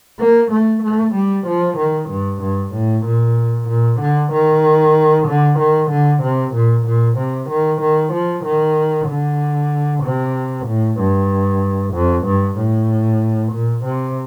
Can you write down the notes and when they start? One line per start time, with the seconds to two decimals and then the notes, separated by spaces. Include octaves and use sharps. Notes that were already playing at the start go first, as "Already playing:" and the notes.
0.19 A#3
0.51 A3
0.83 A3
1.14 G3
1.46 F3
1.78 D#3
2.09 G2
2.42 G2
2.73 A2
3.05 A#2
3.68 A#2
4.00 D3
4.32 D#3
5.27 D3
5.59 D#3
5.90 D3
6.23 C3
6.54 A#2
6.86 A#2
7.18 C3
7.50 D#3
7.82 D#3
8.13 F3
8.44 D#3
9.08 D3
10.03 C3
10.67 A2
10.99 G2
11.94 F2
12.26 G2
12.58 A2
13.53 A#2
13.85 C3